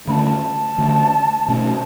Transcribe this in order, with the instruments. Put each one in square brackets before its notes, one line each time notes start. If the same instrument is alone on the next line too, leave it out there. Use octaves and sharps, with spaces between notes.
[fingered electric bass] D3 A3 C#4 [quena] A5 B5
[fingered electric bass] D3 A3 C#4
B2 A3 C#4